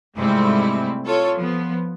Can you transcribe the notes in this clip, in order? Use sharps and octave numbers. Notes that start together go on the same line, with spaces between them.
G#2 C3 G3 A3 C4 E4
F4 A4 C#5
F3 B3